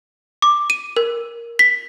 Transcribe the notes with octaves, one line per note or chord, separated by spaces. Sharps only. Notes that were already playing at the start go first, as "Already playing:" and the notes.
D6
D#7
A#4
B6